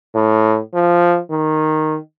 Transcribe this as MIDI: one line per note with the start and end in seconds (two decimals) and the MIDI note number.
0.15 0.59 45
0.74 1.19 53
1.30 1.98 51